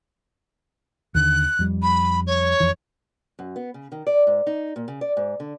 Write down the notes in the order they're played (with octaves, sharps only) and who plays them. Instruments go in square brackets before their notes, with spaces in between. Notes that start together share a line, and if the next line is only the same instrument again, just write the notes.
[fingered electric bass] D#2 D3 [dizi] F#6
[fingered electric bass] F2 G3
[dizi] B5
C#5
[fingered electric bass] F2 E3
[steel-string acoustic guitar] F#2
B3
C#3
D#3
D5
G#2
D#4
A#2
C#3
D5
G#2
D3